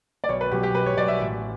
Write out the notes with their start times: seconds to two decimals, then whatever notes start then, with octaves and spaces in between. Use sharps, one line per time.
0.24 D5
0.29 B1 C#5
0.41 B4
0.51 B2 F#3 C#4 G4
0.63 G4
0.74 B1 B4
0.86 C#5
0.97 B2 F#3 C#4 D5
1.08 E5
1.20 A1